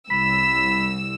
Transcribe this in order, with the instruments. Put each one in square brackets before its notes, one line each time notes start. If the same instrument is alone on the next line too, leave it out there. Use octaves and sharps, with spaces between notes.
[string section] C2 E6 [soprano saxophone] B5